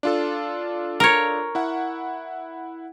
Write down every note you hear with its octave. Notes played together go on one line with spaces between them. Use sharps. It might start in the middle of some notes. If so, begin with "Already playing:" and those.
D4 F4 A4
A#4 C#5
E4 F#5